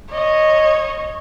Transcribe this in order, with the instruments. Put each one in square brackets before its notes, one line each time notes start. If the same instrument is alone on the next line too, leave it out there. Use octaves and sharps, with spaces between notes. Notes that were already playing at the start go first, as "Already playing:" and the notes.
[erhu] C#5 [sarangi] D#5